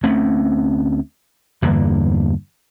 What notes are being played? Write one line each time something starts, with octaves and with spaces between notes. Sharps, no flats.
D2 A3 C4 C#4
E2 G2 D3 A#3